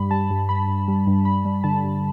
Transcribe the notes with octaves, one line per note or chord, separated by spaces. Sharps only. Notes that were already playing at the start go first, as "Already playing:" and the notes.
Already playing: G2 G3 B5
G3 A5
G2
G2 B5
G2
G3
G2
G2 B5
G3
D3 A5
G2